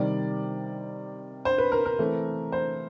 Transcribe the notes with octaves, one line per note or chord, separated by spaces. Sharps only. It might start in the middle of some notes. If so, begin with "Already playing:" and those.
Already playing: C3 D#3 G3 D5
C5
B4
A#4
A#4
E3 A3 C4
C5